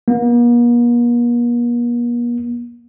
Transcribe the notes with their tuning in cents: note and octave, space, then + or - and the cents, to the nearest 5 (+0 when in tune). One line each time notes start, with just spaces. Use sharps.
A#3 +45